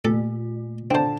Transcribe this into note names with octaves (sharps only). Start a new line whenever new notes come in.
A#2 A3 A4
D3 C4 C5 A5